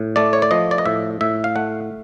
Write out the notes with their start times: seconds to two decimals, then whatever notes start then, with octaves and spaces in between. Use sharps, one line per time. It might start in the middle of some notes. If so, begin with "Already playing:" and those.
Already playing: A2
0.16 A3 D5
0.33 C#5
0.42 D5
0.51 F3 D#5
0.71 D5
0.78 D#5
0.86 A2 E5
1.21 A2 E5
1.44 F5
1.56 A3 F#5